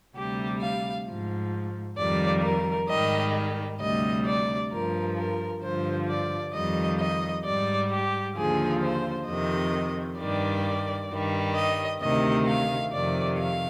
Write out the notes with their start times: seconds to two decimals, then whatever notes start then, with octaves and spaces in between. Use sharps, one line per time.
0.15 D2 C3 G3 G4
0.61 F5
1.06 G#2 F3
1.97 F2 D#3 G3 D5
2.44 A#4
2.89 G#2 D#3 G3 D#5
3.80 D2 C3 G3 D#5
4.26 D5
4.71 G2 F3 A#4
5.17 A#4
5.63 G2 D3 F3 C5
6.09 D5
6.54 F2 D#3 G3 D#5
7.00 D#5
7.45 G#2 G3 D5
7.90 G4
8.36 D#2 D3 F3 G#4
8.82 C5
9.28 F2 C3 D#3 D#5
10.19 G2 D#3 G3 D5
11.10 G2 D#3 G3
11.55 D#5
12.01 D2 C3 D#3 D#5
12.47 F5
12.92 F2 C3 D#3 D5
13.39 F5